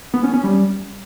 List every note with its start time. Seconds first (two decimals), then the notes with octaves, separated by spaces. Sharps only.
0.14 B3
0.24 C#4
0.34 C#4
0.44 G3